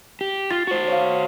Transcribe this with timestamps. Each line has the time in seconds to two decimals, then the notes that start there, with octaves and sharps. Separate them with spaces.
0.21 G4
0.51 F4 A6
0.67 F#4 C5
0.88 C#5 F5